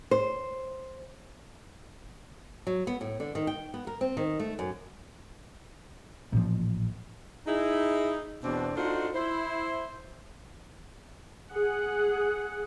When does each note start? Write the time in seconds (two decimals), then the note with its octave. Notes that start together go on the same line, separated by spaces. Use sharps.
0.11 C5
2.67 F#3
2.87 B3
3.01 A2
3.20 D3
3.35 D#3
3.47 G5
3.74 B3
3.87 A#4
4.01 C4
4.17 D#3
4.40 A3
4.59 F#2
6.33 A1 A#2 F3
7.46 D#4 E4 G#4
8.44 E2 B2 C4 D4
8.76 D4 D#4 F4 F#4 A4 C5
9.15 E4 C5
11.51 G#4 F#5